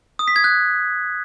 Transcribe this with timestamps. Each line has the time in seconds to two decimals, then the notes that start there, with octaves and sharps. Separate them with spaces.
0.19 D#6
0.28 B6
0.36 G#6
0.44 F#6